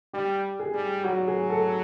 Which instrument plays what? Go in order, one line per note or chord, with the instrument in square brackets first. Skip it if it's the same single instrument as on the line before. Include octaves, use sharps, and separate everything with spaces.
[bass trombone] G3 [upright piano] G4
[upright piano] G#4
[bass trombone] G3
[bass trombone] F#3 [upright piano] F#4
[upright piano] G#4
A4